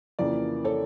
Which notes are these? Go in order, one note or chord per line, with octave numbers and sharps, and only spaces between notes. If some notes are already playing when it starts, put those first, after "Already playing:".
F2 C#3 E3 A#3 A#4 D5
A4 C#5